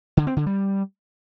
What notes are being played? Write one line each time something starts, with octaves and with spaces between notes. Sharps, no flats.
D3
C4
D3
G3